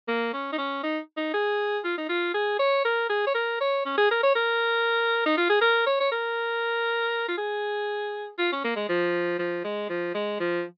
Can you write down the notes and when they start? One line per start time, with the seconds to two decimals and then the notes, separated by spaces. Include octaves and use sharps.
0.08 A#3
0.33 C#4
0.52 D#4
0.58 C#4
0.84 D#4
1.17 D#4
1.34 G#4
1.84 F4
1.98 D#4
2.09 F4
2.34 G#4
2.59 C#5
2.85 A#4
3.10 G#4
3.27 C#5
3.35 A#4
3.61 C#5
3.86 C#4
3.98 G#4
4.11 A#4
4.23 C#5
4.35 A#4
5.26 D#4
5.38 F4
5.49 G#4
5.61 A#4
5.86 C#5
6.00 C#5
6.12 A#4
7.28 F4
7.38 G#4
8.39 F4
8.52 C#4
8.64 A#3
8.76 G#3
8.89 F3
9.39 F3
9.64 G#3
9.90 F3
10.15 G#3
10.40 F3